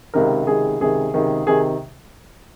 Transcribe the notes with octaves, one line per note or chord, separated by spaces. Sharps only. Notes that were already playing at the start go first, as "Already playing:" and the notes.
C#2 C3 D#3 A#4
C#2 C3 D#3 G#4
C#2 C3 D#3 G#4
C#2 C3 D#3
C3 D#3 G#4